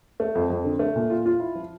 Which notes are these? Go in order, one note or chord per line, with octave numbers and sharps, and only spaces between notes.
A3
F2
F2
D3
A3
A#2
F4
F4
E4
F3